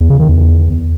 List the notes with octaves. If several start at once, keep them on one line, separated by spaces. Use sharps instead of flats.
E2
C#3
D#3
E2